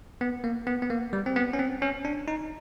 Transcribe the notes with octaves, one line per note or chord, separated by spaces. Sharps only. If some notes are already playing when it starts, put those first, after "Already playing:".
B3
A#3
B3
B3
A#3
G3
C4
B3
C#4
C4
C#4
D4
D#4